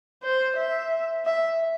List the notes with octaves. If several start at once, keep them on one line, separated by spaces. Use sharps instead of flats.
C5
E5
E5